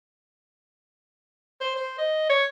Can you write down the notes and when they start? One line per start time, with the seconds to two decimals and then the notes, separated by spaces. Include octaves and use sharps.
1.61 C5
1.76 C5
1.98 D#5
2.29 C#5